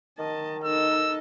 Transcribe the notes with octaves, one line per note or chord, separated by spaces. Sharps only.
D#3 D#5 A5
D#4 A4 A#4 D#5 E6